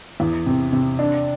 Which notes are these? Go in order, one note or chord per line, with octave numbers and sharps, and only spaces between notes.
E2
C3
C3
D4